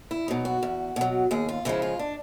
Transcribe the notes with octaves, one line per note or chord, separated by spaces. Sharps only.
E4
B2 F#3 D#4
F#4
E2
B2 F#3
D#2 G#4
F4
C#3 F3 G#3 E4
F4
D4